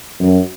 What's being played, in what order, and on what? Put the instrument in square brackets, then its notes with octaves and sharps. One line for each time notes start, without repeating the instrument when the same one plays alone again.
[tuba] F#2